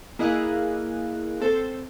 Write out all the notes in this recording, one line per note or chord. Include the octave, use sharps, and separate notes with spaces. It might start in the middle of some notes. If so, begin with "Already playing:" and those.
A#3 E4 G#4 D#5 F5 F#6
C4 A4 C5